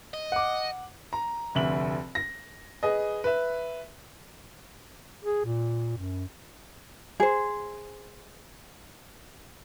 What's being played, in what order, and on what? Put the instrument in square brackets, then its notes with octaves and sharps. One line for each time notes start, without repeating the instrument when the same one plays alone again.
[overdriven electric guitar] D#5
[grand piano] F#5 D6
[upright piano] A#5
F1 D2 E5 F#7
A#6
G#4 B4 D#5
B4 E5
[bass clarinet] G#4
A#2
F#2
[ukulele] G#4 C5